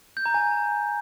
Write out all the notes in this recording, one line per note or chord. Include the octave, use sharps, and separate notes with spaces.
G6
A#5
G#5